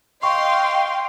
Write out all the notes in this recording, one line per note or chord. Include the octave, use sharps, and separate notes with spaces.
D#5 F5 G5 C6 C#6